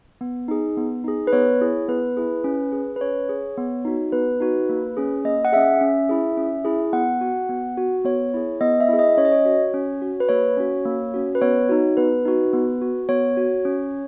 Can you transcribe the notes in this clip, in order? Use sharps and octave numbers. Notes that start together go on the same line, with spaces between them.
B3
D#4 G#4
B3
D#4 G#4
B4
B3 C#5
E4 G#4
B3 B4
E4 G#4
C#4
G#4
B4
C#4 C#5
G#4
B3
D#4 F#4
B3 B4
D#4 F#4
A#3
C#4 G#4
A#3 D#5
F#5
C#4 G#4 E5
C#4
E4 G#4
C#4
E4 G#4
B3 F#5
F#4
B3
F#4
B3 C#5
E4 G#4
B3 D#5
E5
E4 G#4
D#5
C#4 C#5
D#5
C#5
F#4
C#4
F#4
B4
A#3 C#5
C#4 F#4
A#3
C#4 F#4
B4
B3 C#5
D#4 F#4
B3 B4
D#4 F#4
B3
F#4
B3 C#5
F#4
C#4